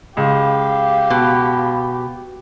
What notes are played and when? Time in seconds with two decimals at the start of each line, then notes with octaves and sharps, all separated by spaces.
0.17 C#2 G4 F5
1.10 B2